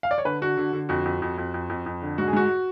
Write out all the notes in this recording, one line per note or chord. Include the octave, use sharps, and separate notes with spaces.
F5
D5
C#5
D3 B4
D3 F#4
D3
D3
F2 F#4
F2
F2
F2
F2
F2
F2
D3
G#2 F#4
G#4
G#2 F#4